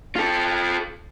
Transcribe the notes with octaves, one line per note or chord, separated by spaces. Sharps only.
F4 A4